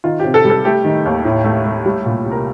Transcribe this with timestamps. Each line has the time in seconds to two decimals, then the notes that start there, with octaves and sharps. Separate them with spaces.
0.04 D#3 F4
0.20 C3 G4
0.34 A4
0.45 G3
0.50 A4
0.64 A3 G4
0.84 D#3
1.05 D#2
1.25 A2
1.44 A3
1.65 A3
1.86 G3
2.06 A#2
2.26 C2
2.31 A#4